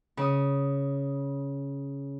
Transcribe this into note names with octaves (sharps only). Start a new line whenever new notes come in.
C#3 D#6